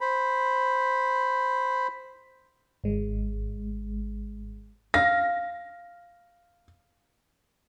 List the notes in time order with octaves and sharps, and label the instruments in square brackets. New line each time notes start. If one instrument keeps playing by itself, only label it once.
[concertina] C5 B5
[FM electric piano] G#1 G#3
[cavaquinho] F5 [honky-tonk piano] A#6